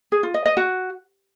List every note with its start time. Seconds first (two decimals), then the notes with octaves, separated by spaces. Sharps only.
0.12 G#4
0.23 F4
0.34 D#5
0.46 D#5
0.57 F#4